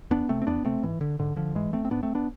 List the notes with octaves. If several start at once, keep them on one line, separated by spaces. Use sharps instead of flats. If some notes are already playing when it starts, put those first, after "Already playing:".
E2 B3 D4
C3 A3 C4
C4
E2 B3 D4
C3 A3 C4
G#2 E3
D3
G#2 D3
D3 F3
G#2 E3 G#3
A3 C4
C4
G#2 B3 D4
A3 C4
B3 D4